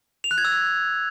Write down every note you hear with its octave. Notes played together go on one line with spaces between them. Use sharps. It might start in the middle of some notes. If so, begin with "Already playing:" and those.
F7
F#6
G#6
E6